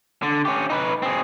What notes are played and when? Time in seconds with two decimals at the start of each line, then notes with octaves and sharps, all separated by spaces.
0.23 D3
0.45 C#4 G4
0.70 D#4 B4
1.03 C4 G#4